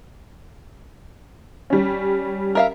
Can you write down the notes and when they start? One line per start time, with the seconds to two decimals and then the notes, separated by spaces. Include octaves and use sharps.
1.70 G3 C#4
2.55 A#4 E5 F5